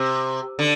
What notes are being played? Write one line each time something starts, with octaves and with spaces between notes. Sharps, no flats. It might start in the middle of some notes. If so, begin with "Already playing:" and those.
Already playing: C3
D3